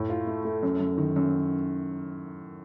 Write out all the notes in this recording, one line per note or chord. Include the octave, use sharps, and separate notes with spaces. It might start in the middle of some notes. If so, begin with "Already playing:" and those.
Already playing: A2
F4
A3
A3
F#2
F#2
D#3
F#2